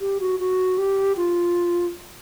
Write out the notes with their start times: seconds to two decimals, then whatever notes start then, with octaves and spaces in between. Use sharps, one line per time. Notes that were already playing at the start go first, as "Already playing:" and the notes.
0.01 G4
0.20 F#4
0.40 F#4
0.78 G4
1.17 F4